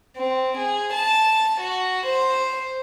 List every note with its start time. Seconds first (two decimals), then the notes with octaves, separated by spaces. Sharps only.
0.16 C4
0.57 G#4
0.93 A5
1.60 F#4
2.06 C5